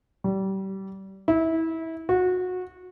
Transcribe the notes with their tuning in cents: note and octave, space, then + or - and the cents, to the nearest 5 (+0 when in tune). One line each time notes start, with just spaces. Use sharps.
G3 -25
E4 -25
F#4 -20